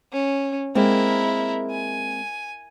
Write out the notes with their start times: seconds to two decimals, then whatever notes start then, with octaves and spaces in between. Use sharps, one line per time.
0.12 C#4
0.75 G#3 A#3 C4 E4 A#4
1.71 G#5